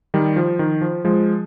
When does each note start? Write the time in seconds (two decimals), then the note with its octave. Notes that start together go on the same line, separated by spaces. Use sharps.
0.14 D#3 G3
0.36 F3
0.59 D#3
0.81 F3
1.05 F3 G#3